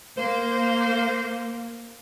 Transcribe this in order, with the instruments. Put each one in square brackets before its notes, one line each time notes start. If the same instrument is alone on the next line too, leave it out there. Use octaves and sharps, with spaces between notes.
[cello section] A#3 [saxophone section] C5